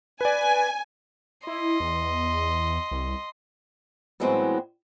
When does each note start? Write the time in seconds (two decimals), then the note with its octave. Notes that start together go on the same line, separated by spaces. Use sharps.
0.21 B4 D5 G#5
1.47 E4 D#5 C6
1.80 E2
2.91 C2
4.20 A2 E3 F#3 G#3 B3 C4